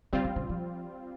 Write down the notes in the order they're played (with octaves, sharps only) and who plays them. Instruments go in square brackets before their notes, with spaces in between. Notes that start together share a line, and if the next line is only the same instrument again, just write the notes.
[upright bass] C#3 [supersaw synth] G3 C4 F4
[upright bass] C#3
C#3
F3